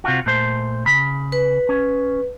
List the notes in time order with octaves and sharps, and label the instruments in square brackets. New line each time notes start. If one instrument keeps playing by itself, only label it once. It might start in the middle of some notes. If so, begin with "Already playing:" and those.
[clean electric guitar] C3 F4 F#4
A#2 A3 C5
C#3 B5
[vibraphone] B4
[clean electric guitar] C#4